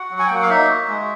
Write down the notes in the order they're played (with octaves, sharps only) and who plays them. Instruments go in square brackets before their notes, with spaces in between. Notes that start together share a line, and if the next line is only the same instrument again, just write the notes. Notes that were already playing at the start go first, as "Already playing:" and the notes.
Already playing: [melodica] F#4 F#5
F#3
G#5
G5
A#3 F#5
F5
D#4 E5
F#4
G#3